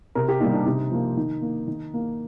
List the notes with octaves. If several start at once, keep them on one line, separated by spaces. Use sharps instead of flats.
C3 A#4
G4
D#3 G3 A#3 D#4
D4
C3 D#4
F3 A#3
D#3
A#3
D#3
A#3